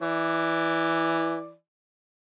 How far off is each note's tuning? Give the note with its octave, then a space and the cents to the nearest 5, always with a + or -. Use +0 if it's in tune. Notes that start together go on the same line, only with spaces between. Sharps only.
E3 +0 D5 +0